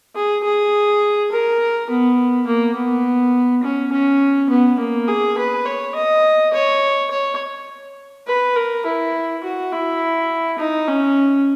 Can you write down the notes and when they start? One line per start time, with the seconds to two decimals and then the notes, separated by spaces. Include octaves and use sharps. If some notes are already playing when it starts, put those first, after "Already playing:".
0.15 G#4
0.44 G#4
1.32 A#4
1.90 B3
2.47 A#3
2.76 B3
3.63 C#4
3.92 C#4
4.50 B3
4.79 A#3
5.08 G#4
5.38 B4
5.66 C#5
5.95 D#5
6.53 C#5
7.11 C#5
8.27 B4
8.56 A#4
8.86 E4
9.44 F#4
9.72 E4
10.59 D#4
10.88 C#4